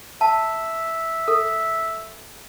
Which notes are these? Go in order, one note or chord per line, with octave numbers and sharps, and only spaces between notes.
E5 A5
A4